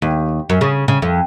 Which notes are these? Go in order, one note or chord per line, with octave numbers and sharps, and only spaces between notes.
D#2
F#2
C#3
C#3
F2